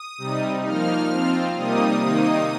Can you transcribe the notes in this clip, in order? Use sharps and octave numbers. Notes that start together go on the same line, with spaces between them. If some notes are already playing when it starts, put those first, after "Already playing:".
Already playing: D#6
C3 G3 D#4
F3 A#3 D#4 F6
F3 C4 F4
C3 G3 A#3 D#4 D#6
C3 D#3 A#3 D#4